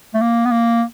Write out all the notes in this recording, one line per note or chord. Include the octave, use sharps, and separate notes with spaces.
A3
A#3
B3
A#3